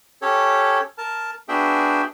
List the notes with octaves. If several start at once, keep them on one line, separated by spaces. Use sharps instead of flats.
C#4 G4 A4 C#5
A#4 A5
B3 D4 F#4 G#4 E5 G5